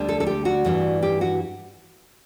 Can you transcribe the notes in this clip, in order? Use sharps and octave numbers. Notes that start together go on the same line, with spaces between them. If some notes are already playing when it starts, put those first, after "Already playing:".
Already playing: D2 D3 G3
A4
A4
G4
F#4
G2 E3 G3
G4
F#4